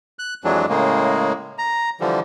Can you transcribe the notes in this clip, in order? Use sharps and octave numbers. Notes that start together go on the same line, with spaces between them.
F#6
F2 E3 F#3 G#3 D4
A2 C#3 G#3 A#3
A#5
D3 E3 F3 G3